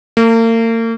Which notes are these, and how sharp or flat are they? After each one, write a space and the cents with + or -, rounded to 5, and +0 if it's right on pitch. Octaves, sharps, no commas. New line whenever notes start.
A#3 -40